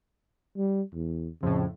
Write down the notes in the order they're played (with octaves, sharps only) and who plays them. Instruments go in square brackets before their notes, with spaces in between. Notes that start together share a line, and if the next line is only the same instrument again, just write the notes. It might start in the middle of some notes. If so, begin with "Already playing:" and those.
[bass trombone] G3
E2
[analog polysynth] F2 A2 [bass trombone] C#3